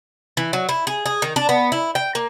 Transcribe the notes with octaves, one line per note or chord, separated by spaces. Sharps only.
E3
F#3
E4
G#4
G#4
D#3
D4
B3
E4
G5
A#3